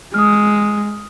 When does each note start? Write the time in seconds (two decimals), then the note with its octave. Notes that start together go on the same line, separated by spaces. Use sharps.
0.14 G#3 D#6 F6